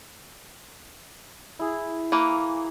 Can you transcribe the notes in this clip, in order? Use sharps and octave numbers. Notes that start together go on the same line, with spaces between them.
E4 G#4
E3 A#3